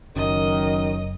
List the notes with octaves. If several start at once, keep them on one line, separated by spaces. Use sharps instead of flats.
F#1 F#2 D#3 D#5